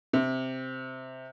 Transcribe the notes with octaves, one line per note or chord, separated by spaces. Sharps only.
C3